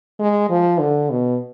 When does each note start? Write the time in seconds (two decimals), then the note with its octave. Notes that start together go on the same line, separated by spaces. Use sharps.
0.20 G#3
0.50 F3
0.80 D3
1.10 B2